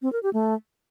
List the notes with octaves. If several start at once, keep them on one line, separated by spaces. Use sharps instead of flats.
C4
A#4
G4
A3